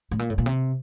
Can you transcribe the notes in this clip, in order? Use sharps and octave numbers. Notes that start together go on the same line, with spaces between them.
A2
A#2
A2
A#2
C3